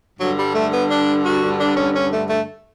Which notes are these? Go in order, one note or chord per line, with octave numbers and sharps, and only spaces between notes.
G2 D3 F#3
G3
A3
B3
D4
F#4
D4
C#4
C#4
A3
A3